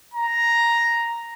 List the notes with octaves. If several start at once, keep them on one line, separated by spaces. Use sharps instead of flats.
A#5